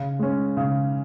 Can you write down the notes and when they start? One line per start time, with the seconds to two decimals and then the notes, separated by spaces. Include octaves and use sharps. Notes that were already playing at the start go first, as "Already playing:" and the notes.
Already playing: C#3
0.19 G#3 C#4
0.57 C#3